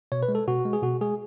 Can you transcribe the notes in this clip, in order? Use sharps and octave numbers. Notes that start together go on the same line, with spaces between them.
B2 C#5
B4
G#3
A4
B2 F#4
G#3
G#4
B2 F#4
G#3 G#4